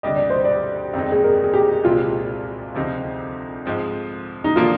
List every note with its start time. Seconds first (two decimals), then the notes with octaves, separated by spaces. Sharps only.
0.03 D2 C3 G3 D4 G4 D#5
0.16 D5
0.30 C5
0.44 D5
0.93 F2 D#3 G#3 C4 D#4
1.12 G#4
1.24 A#4
1.44 G#4
1.53 G4
1.84 C2 A#2 G#3 C4 F4
2.75 D2 C3 F3 C4 D#4
3.66 G#2 F3 C4
4.44 D#4
4.56 D3 F3 A#3 D4 F4